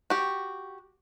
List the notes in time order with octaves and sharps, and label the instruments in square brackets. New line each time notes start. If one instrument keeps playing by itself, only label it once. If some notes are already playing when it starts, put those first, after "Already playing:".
[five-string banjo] F#4 G4